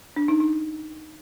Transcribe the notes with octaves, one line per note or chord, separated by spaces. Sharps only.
D4
D#4
D#4